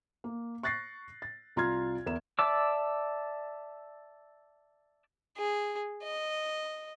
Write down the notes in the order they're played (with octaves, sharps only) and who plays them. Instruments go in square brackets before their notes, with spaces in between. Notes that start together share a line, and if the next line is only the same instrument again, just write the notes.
[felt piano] A#3
C#6 F#6 A6 A#6 C7
A6
C2 F4 A#5 C6 F6 G#6
E2 A#4 E5 E7
[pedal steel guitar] D5 E5 A5 D6 E6
[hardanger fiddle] G#4
D#5